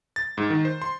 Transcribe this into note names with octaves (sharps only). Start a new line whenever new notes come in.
A6
G#2
D#3
C5
C6